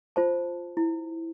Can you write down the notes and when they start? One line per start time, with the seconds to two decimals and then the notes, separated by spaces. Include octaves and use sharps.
0.16 F4 C5 A5
0.77 E4